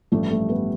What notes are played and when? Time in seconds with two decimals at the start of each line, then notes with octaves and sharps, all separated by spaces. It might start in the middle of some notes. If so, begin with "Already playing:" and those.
0.12 A1 G2 F3 G3 A3 G4
0.30 A3 A4
0.48 B3 B4